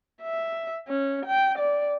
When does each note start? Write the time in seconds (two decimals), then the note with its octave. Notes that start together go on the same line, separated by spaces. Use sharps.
0.22 E5
0.88 C#4
1.26 G5
1.59 D5